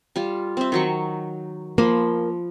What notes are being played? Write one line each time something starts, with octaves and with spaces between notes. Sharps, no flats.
G3 F4
C4 E5
D#3 F#3 C#6
F3 A#3 B5 C6